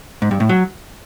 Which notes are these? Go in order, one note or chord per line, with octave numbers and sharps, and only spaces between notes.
G#2
G2
A2
F#3